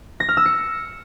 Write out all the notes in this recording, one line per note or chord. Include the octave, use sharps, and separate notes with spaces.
A#6
F6
E6
C#7